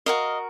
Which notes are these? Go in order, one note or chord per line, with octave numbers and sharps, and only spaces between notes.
F#4 A#4 D#5 F5